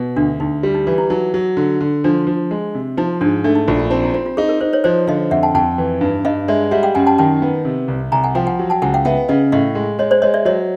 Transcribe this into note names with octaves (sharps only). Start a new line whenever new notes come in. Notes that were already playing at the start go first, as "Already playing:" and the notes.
Already playing: B2
D2 D4
D2 D#4
G3
D#4
E3 F4
E4
F#3 D#4
F#3
D3
D3
F3 D4
F3
G#3
C3
F3 D#4
G#2 D4
A3 D4
D#4
A#1 D#4
F4
C4 D#4
E4
C4 F4
F4
D#4 G#4
A#4
D#4 C5
B4 C#5
F3 C5 D5
D3 D#5 F5
F2 E5 F#5
G5 A5
F2 G5 A5
E3
G2
G2 D#5 F5
G#3 D5 E5
G3 E5 F#5
F5 G5
F#2 F#5 G#5
G5 A5
D#3 G5 A5
B3
C3
C2
C2 G#5 A#5
F#5 G#5
F3 F5 G5
F#5 G#5
F#3
G5 A5
C#2 F#5 G#5
F5 G5
B3 E5 F#5
C#3 D#5 F5
A2 D#5 F5
G#3
G#3 C#5 D#5
C5 D5
G#3 C#5 D#5
D5 E5
F#3 C#5 D#5